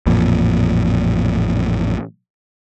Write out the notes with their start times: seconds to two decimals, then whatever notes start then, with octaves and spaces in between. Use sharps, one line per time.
0.06 A1 F2 A#2